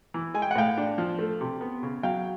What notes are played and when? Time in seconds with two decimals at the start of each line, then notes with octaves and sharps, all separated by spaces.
0.14 E3
0.34 G#3 G#5
0.42 G5
0.51 F#5
0.56 A2 F5 G5
0.78 D4
0.98 F3
1.19 A3
1.41 C3
1.61 B3
1.83 C#3
2.03 F#3 F5 G5